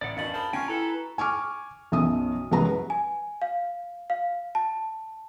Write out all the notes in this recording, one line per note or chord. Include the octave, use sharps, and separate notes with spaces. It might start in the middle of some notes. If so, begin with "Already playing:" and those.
A1 D5 F#5
F#2 B2 D#3 D4 F5 A6 F#7
G#4 A#4 C5 A5 B5 G7
C#4 F4 F5 G5 G#5 C#6
E4 F#4 A4 B4 A#5
G#5 C#6 D6 F6
B1 F#2 E5 D#6
C2 F#2 F#3 G#3 B4 A#5
G#5
F5
F5
A5